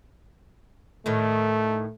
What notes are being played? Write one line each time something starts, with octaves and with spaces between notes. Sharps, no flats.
A2 D#3 A3